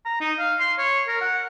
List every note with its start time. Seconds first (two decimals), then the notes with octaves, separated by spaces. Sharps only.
0.05 A#5
0.21 D#4
0.39 F5
0.60 C6
0.79 C#5
1.08 A#4
1.21 F#5